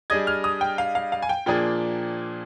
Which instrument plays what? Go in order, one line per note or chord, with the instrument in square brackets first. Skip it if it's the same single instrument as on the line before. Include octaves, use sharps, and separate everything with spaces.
[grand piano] G3 D4 G#4 D#5 [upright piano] G#6
[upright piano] F6
D#6
G5
F5
F5
F5
G#5
G5
[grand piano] A#2 F3 A#3 D4 G#4 [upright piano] G5